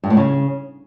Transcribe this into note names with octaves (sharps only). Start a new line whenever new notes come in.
G2
A2
C#3